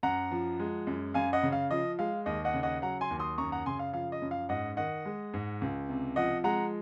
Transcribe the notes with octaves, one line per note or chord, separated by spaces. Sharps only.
F#2 F#5 A#5
F3
G#3
F#2
F#2 F5 G#5
D#5 F#5
C#3
F5
F3 D#5
G#3 F5
D#2 D#5
D#5 F#5
C#3
D#5 F#5
F#3 F#5 A#5
G#5 C6
D#2
C6 D#6
F#2 A#5 C#6
F#5 A#5
C#3 G#5 C6
F5
F3 F5
D#5
F#2
F5
G#2 D#5 F#5
D#3 D#5 F#5
G#3
G#2
C#2
C3
F3 D#5 F#5
G#3 F#5 A#5